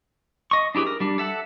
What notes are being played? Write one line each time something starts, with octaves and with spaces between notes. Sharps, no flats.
D#5 C#6
D4 E4 G4 G#4 B4
A#4
G3 D4
A4 E5 F#5